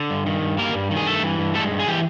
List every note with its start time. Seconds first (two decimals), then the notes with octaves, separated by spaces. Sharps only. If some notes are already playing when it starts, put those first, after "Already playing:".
Already playing: D3
0.10 G2
0.26 D#3
0.42 G2
0.58 G3 A#3 A#4
0.74 G2
0.91 D#3
0.97 G#4
1.06 G2 A3 A4
1.23 E3
1.39 G2
1.55 G#3 A3 A4
1.71 G2
1.79 G#4
1.87 E3 G4